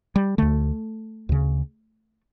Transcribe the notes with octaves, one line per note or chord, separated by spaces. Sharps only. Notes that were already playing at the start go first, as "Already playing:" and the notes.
G3
D2 D3 A3
D2 C#3